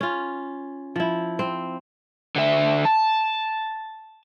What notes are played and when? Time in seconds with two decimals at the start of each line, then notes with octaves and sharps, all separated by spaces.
0.01 C#4 F4
0.96 F3 E4
1.39 C4
2.36 D3 E5
2.85 A5